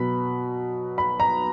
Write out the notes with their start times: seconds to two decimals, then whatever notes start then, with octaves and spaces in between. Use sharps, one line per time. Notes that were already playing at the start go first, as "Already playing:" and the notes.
Already playing: B2 F#3 B5
0.98 B5
1.20 A#5